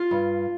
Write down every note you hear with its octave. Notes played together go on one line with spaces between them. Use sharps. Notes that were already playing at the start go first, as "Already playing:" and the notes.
Already playing: F4
G2